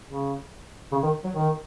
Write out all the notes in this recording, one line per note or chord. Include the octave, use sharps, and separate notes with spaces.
C#3
C#3
D#3
F#3
D#3